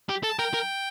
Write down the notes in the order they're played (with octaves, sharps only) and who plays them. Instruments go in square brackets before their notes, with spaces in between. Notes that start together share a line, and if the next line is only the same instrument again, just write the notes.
[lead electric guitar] G4
[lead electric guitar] A4 [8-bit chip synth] A5
[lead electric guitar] A#4 [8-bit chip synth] G5
[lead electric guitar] A#4